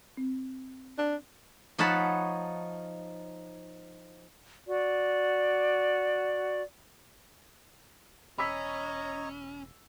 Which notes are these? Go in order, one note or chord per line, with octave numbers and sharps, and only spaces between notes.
C4
D4
F3 D#4 C#5 F#5 A5 B5
F#4 D5
E1 C#4 C#5 D#5 A#5 B5 E6 B6